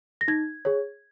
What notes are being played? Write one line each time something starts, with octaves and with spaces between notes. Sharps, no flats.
A#6
D#4 G#6
G#4 C#5